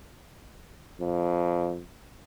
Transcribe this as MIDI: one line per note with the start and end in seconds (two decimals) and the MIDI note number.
1.00 1.81 41